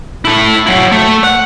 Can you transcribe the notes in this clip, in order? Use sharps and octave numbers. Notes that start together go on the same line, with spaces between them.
E4 A4
F#3 E4
A3
F#5